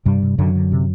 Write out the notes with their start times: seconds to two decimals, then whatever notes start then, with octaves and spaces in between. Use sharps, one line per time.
0.05 G2 C3 G3
0.22 C3
0.38 F#2 D3 F#3
0.55 D3
0.72 C3